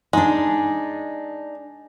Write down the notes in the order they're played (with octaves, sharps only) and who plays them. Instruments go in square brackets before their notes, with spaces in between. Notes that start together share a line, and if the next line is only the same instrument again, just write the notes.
[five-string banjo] G#3 [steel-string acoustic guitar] D4 D#4